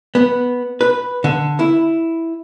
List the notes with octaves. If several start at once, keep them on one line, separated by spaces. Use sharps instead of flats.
B3
B4
D3
E4